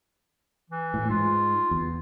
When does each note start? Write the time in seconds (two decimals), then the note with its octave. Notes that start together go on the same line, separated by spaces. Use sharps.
0.70 E3
0.94 A2
1.10 G#2 F4
1.71 E2